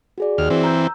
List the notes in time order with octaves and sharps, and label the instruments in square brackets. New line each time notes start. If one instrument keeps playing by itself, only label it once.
[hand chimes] F#4 G#4 D5
[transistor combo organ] D#2 F6
E3 C4
[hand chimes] A#5 E6 G6